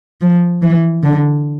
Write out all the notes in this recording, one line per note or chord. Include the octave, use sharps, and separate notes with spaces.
F3
E3
D3